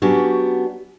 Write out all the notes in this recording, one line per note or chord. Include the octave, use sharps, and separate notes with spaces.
F#3 B3 C#4 D4 F#4 G4